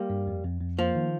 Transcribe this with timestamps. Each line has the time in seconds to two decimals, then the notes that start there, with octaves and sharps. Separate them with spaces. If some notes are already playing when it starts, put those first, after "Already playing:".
Already playing: G3 A#3
0.10 G2
0.27 F2
0.44 F2
0.61 F2
0.79 F3 A#3
0.95 D#3